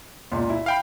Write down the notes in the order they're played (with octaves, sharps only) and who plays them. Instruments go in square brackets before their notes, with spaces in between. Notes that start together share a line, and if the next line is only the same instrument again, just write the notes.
[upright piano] C#2 A#2
E4
[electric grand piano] F5 G5 B5